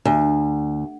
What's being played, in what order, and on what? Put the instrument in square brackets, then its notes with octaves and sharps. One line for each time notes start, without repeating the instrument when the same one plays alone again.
[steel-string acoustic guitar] D2